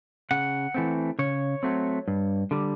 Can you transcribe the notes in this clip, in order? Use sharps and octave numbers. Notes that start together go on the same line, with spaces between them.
C#3 F#5
E3 A3 C4
C#3 C#5
F#3 A3 C4
G2
D3 G3